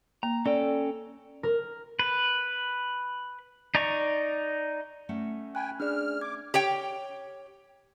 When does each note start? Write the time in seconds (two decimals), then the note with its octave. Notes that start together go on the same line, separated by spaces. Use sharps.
0.23 A#3 A#5
0.46 C#4 A4 D5 G5
1.43 A#4
1.99 B4
3.75 D#4 D5 A#5 C#6
5.09 A3 C#4 F#5
5.55 G5 G#5 B5 F#6
5.80 D4 G#4 D5 F6
6.21 D6 G#6
6.54 G4 C#5 G5